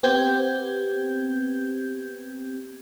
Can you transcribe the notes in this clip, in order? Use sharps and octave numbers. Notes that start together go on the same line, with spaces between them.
B3 C4 G4 G6 G#6